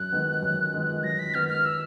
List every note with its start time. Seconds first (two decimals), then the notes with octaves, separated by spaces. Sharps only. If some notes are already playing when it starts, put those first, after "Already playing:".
Already playing: F#2 F#6
0.13 D#3 G#3 B3
0.42 F#2
0.74 D#3 G#3 B3
1.03 F#2 A#6
1.19 B6
1.34 D#3 G#3 B3 F6
1.49 F6
1.65 E6